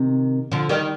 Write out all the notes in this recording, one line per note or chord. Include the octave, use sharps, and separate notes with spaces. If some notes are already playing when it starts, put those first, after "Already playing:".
Already playing: C3 D#3
D3 F3
D#3 G3